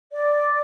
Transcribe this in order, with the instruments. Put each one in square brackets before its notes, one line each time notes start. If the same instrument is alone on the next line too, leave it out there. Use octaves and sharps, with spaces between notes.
[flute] D5